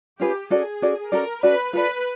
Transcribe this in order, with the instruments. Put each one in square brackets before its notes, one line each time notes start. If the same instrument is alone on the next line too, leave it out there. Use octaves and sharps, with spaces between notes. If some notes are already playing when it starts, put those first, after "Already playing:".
[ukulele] C#4 F4 G#4 B4 [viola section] G4
[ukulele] C#4 F#4 A4 D5 [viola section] G#4
[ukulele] C#4 F#4 A4 D5
[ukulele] C#4 F#4 A4 D5 [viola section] A#4
[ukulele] C#4 F#4 A4 D5 [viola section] B4
[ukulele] F4 A4 D5 [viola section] B4